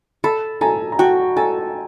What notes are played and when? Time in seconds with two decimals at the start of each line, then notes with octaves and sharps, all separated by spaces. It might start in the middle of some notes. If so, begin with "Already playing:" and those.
0.24 A4 A5 B5
0.61 A4 G#5 A#5
0.92 A#5
0.99 F#4 G5 A5
1.37 A4 G#5 A#5